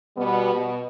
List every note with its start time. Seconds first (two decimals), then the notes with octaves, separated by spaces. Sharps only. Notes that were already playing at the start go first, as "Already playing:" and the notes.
0.17 B2 G3 B3
0.54 B2